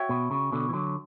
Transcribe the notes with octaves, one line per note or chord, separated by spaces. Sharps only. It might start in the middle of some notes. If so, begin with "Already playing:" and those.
Already playing: F#4 C#5 E5 G5
B2
C#3
B2 D3
E3
D3 F#3